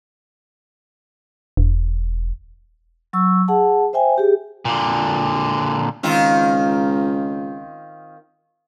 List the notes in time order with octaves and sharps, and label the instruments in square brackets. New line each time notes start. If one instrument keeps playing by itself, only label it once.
[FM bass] E1
[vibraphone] F#3 C#6 E6
G#4 F#5 A5
C5 E5 G5 G#5
G4 G#4
[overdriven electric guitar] A#2 D3
[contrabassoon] C#2 [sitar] D#3 C4 F4